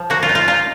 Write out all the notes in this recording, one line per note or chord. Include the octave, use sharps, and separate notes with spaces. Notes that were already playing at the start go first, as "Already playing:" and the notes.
Already playing: F3
A#3 F#4
F4
D#4
F4
D#4 F4